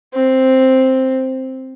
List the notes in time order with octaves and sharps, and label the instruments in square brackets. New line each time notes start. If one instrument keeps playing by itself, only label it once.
[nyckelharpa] C4